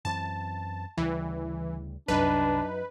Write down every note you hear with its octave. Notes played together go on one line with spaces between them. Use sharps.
F#2 E3 C4 A5
D2 C#3 E3 G3
C2 F#2 C3 D4 D#4 B4